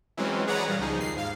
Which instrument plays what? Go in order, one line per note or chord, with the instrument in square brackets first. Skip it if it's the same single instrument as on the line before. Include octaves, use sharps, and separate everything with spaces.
[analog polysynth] E3 F#3 G#3 C4 C#4
G#4 B4 C#5 D5 F#5 A#5
A#2 G3 F5
C#2 F3 D#4 G#4
D#2 C7
G#2 F5